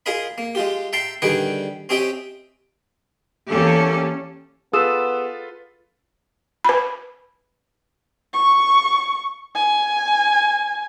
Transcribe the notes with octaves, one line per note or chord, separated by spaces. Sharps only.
F4 G#4 A#4 D#5 B5
A#3
G#3 F4 G4
E5 G5 A5 A#5 C6
D3 D#3 G3 G#4 B4 G5
C4 C#4 G4 D#5 E5 G5
E2 A#3 C#4 G4 A4
B3 F4 G#4 A4 B4 D#6 E6 E7
B4 B5
C#6
G#5